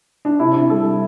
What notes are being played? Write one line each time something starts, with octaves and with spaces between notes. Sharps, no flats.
D4
C3 E4
C3
G3 A4
G3